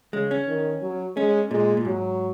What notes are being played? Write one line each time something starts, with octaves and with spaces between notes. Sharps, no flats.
C#3 G#3
C#4
D#3
F#3
G#3 C#4
A#2 G#3
A#2
G#2 F#3